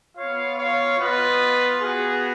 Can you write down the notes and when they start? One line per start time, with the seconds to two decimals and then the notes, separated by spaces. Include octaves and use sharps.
0.17 B3 F4 C#5 F5
0.58 C#5 F5
0.99 B3 F4 B4 D#5
1.82 B3 F#4 G#4